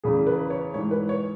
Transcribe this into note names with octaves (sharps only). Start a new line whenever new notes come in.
E2 C#3 E3 G#4
B4
C#5
G#2 E3 C#5
B4
C#5